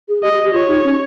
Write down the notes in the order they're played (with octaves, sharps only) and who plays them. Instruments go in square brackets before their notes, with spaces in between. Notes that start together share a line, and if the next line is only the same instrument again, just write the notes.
[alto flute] G#4
[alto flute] G4 [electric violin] D#5
[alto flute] G4
G4
[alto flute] F4 [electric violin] C#5
[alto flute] D#4
C#4